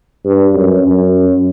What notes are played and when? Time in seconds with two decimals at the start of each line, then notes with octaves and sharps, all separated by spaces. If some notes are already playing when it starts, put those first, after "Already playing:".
0.24 G2
0.54 F#2
0.85 F#2